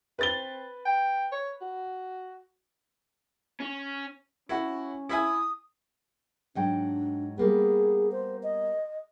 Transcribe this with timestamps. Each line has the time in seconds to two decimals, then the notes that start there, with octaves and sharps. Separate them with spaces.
0.19 C4 B4 A6 G7
0.85 G5
1.32 C#5
1.61 F#4
3.60 C#4
4.49 C#4 E4 F#4
5.09 E4 E5 G#5 D#6
6.55 G#2 F#3 D4 G5
7.38 G3 A#3 B3 G#4
8.12 C5
8.43 D#5